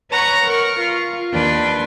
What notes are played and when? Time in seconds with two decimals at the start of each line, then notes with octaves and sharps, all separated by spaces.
0.11 B4 C#5 F#5 A#5 C#6
0.45 A#4 C#6 F6
0.80 F4
1.32 D#2 D4 B4 G5 C6